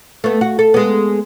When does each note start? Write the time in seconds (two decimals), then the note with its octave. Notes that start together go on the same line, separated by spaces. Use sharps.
0.24 A3 B3
0.41 F#4
0.59 A4
0.74 G#3 B3